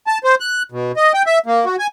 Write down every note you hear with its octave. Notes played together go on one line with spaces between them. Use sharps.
A5
C5
F#6
B2
D#5
G5
E5
A#3
F#4
G#5